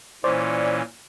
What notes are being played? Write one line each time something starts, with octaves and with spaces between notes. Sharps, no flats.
A#2 E3 C#4 C5 D5